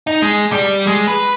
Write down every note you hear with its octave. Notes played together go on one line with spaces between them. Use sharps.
D#4
G#3
G3
G#3
B4